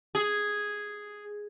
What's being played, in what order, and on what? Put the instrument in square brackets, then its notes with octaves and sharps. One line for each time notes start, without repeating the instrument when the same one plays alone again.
[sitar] G#4